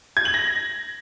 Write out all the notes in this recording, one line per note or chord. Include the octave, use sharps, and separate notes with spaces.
G#6
F#7
A#6